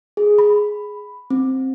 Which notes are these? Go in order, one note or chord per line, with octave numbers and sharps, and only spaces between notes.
G#4
B5
C4